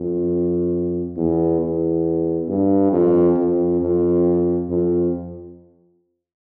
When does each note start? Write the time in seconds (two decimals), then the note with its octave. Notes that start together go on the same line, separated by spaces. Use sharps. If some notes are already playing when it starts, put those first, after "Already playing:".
Already playing: F2
1.17 E2
1.61 E2
2.49 G2
2.92 F2
3.37 F2
3.81 F2
4.69 F2